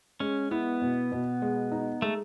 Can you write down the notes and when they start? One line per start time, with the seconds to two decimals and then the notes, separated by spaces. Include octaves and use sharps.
0.20 G#3 C#4
0.51 B3 E4
0.82 B2
1.12 B2
1.42 G#3
1.72 D#4
2.02 G#3 A3